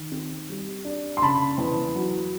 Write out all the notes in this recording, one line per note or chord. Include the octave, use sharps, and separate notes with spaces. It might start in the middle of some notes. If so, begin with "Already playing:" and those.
Already playing: D#3
C4
G3
D4
C6
C#3 A5 B5
E2
F#3